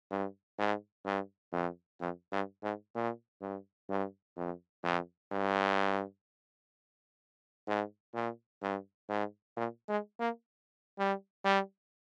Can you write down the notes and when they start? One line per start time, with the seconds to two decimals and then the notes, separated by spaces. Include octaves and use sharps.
0.11 G2
0.59 G#2
1.05 G2
1.53 F2
2.00 F2
2.32 G2
2.63 G#2
2.95 A#2
3.42 G2
3.90 G2
4.36 F2
4.84 F2
5.32 G2
7.68 G#2
8.14 A#2
8.62 G2
9.09 G#2
9.57 A#2
9.89 G#3
10.20 A#3
10.98 G3
11.45 G3